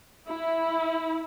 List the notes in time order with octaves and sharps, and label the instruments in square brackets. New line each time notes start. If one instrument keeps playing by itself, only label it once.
[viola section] E4